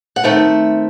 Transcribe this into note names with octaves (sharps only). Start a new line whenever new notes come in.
F#5
D#3 A3 C4 E5